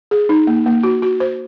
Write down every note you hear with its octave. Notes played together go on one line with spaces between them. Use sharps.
G#4
D#4
A#3
A#3
F#4
F#4
C5